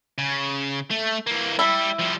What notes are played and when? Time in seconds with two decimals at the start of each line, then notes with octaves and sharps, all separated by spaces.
0.18 C#3
0.91 A3
1.27 E3 A#3
1.59 G3 E4
1.99 F3 G3